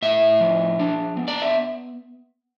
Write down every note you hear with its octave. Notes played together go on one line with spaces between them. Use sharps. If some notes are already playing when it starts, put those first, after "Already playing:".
A2 E5
F3
D4
B3
D5
E5